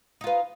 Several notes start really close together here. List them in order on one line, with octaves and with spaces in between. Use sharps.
D#4 F4 B4